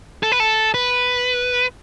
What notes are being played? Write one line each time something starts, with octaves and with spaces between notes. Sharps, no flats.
A4
B4
A4
B4